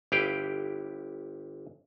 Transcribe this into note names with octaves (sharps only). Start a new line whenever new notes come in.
G1 E4 G4 B4 F5 G5